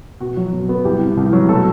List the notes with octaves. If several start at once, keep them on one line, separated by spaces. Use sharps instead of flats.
B2 F#4
F#3
B2
B3
C2 G4
C3
C2
F#3
B2 A3 A4